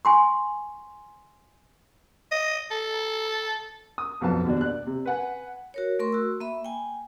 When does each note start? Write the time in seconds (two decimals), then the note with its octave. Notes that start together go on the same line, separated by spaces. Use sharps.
0.05 G#5 C6 C#6
2.31 D#5
2.71 A4
3.98 D#6
4.21 B1 F2 B4 A5
4.45 D#2 B2 G3 D4
4.61 D5 F#6
4.86 C3
5.06 B4 F#5 G#5
5.74 F#4 A#4 C#5
5.99 A3 A#4 C6 C#6
6.13 F#4 E6
6.40 A#3 E5 B5
6.65 G5 G#5